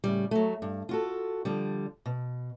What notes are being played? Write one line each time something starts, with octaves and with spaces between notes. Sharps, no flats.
A2 C#3 G3
F#3 A3
G2
F4 F#4 A4
D3 F3 G3
B2